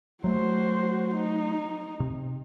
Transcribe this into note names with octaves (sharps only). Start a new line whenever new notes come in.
F#3 A3 F#4 C5
D#4
C3